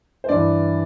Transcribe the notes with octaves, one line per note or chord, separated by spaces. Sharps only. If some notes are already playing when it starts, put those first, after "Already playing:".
C5
G2 E3 D5